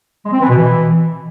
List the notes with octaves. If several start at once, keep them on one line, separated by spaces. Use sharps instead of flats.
G#3
C4
E3
B2
E3